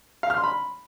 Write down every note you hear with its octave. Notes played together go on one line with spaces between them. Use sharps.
F5
F6
C6
B5